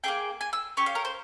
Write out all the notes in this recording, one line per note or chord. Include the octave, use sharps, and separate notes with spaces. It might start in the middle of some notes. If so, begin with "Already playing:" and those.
A#3 E4 G#4 G5
G#5
E6
C#4 G4 C#6
F5
A#4
C5